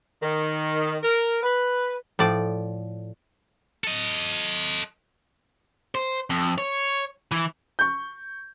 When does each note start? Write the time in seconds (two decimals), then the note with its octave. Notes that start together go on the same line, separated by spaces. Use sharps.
0.23 D#3
1.03 A#4
1.43 B4
2.19 A2 F3 D5
3.84 A4 D#5
5.95 C5
6.30 F2
6.58 C#5
7.32 E3
7.79 C#6 G6